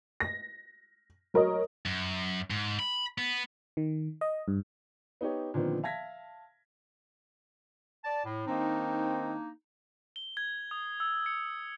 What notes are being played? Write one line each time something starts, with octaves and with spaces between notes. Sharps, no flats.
A#6
F#3 A#4 C#5 D#5
F#2
G#2
B5
B3
D#3
D#5
G2
B3 D#4 G4 C#5
A#2 D3 D#3 F3 B3 C4
E5 F5 A5 G#6 A#6 B6
D5 A5
A2
D#3 A#3 C4 D4 D#4
G7
G#6
D#6
E6
C#7